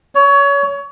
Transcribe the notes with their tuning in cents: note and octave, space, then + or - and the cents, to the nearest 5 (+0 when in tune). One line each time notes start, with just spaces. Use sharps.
C#5 +25